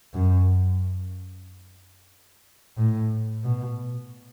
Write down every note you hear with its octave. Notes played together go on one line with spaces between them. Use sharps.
F#2
A2
B2